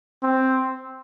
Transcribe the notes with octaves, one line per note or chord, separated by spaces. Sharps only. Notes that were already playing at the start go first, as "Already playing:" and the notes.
C4